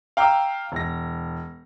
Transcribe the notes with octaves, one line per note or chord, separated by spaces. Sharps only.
F5 G5 A#5 D6 E6
E1 A#6